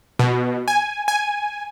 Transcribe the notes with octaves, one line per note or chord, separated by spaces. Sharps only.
B2
G#5
G#5